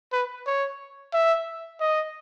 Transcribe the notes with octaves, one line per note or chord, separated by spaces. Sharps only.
B4
C#5
E5
D#5